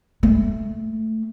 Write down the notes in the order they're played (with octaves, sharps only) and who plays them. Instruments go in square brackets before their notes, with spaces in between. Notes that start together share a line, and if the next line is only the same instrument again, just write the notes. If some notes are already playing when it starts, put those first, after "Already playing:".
[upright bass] A3